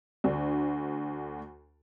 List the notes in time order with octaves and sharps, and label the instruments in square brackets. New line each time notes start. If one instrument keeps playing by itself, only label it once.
[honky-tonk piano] D2 D3